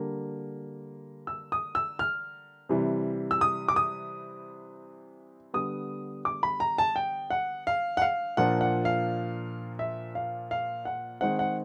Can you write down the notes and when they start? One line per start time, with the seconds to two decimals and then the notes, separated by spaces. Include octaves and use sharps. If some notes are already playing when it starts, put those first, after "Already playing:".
Already playing: D3 G3 A#3
1.27 E6
1.52 D#6
1.75 E6
1.99 F6
2.69 C3 E3 G3
3.31 E6
3.41 D#6
3.68 D6
3.76 D#6
5.54 D3 G3 B3 D#6
6.25 D6
6.43 B5
6.60 A#5
6.78 A5
6.96 G5
7.30 F#5
7.67 F5
7.97 F#5
8.02 F5
8.37 A#2 F3 A#3 D4 F#5
8.61 F#5
8.85 F5
9.79 E5
10.15 F5
10.51 F5
10.85 F#5
11.21 D#3 G#3 C4 D#4 F#5
11.39 F#5